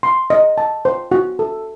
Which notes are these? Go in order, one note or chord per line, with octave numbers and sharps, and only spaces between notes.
C6
D#5
A5
C5
F#4
A4